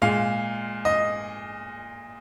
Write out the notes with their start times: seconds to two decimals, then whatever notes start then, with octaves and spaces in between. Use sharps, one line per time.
0.02 A#2 G#3 F5
0.85 D#5